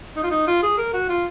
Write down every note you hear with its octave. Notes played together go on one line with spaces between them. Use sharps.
D#4
F4
D#4
F4
G#4
A#4
F#4
F4